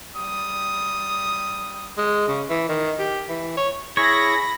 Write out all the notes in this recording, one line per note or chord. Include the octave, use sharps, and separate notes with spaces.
G3 D#6
G#3
C#3
E3
D#3
G4
E3
C#5
E4 G#4 C#5 B5 A#6